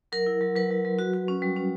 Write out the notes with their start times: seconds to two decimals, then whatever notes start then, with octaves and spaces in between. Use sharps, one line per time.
0.12 F#3 A#4
0.26 E4
0.41 F#3
0.55 F#3 B4
0.70 F#3
0.85 F#3
0.99 F#4
1.13 F#4
1.28 C#4
1.42 G3
1.56 C#4